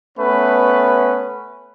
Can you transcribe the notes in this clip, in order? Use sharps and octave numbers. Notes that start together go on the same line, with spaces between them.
A3 B3 C#4 B4